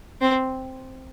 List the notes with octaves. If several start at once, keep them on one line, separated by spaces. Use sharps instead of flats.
C4